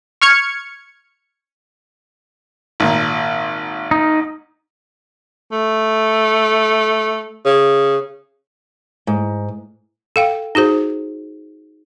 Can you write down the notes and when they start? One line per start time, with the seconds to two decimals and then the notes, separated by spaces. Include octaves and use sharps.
0.21 C#6 F6 G#6 C#7
2.80 G#1 A#2
3.91 D#4
5.52 A3
7.46 C#3
9.07 G#2
10.16 A4 F5 G5
10.55 D#4 F#4 G#4 C5